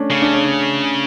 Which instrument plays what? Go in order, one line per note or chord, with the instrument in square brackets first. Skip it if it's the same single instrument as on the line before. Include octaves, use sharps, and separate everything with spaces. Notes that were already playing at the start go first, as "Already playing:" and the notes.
Already playing: [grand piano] A3 C#4 D4
[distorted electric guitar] C#3
[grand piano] D4
C#4
D4